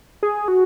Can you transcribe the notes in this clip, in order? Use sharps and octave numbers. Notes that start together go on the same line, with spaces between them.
G#4
F#4